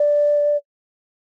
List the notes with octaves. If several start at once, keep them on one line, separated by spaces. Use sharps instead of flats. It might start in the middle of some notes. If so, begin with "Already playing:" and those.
Already playing: D5